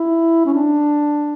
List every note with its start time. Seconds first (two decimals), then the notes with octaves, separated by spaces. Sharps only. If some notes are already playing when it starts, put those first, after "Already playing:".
Already playing: E4
0.45 C#4
0.54 D4